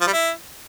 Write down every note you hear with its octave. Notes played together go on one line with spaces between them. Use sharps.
F3
G3
E4